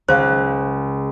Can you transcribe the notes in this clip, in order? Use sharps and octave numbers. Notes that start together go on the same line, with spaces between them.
C#2 C5 F5